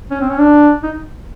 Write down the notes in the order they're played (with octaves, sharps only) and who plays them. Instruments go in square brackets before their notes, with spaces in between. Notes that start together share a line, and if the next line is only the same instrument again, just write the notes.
[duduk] C#4
C4
C#4
D4
D#4